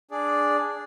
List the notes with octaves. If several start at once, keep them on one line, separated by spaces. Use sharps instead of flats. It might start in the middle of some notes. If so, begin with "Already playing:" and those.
D4 G#4 D5